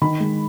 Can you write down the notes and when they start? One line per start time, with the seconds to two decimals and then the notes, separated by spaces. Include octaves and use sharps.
0.01 D#3 B5
0.20 G#3